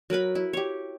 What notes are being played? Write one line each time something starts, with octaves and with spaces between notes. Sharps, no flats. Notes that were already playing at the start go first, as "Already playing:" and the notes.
F#3 A#4 B4 B5
E4
G4 C#5